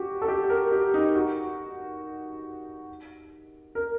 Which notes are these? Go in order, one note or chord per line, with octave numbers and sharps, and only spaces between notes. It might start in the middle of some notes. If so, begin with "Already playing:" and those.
Already playing: F#4 G4
A4
G4
A#4
G4
D#4
F#4
A#4